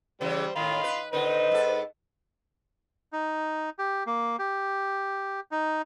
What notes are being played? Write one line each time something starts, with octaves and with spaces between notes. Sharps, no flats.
C#3 E3 G3 C5
A2 D#3 F5 B5 C6
B4
A#2 D3 D#4 B4 C5
G#2 A4
D#4
G4
A#3
G4
D#4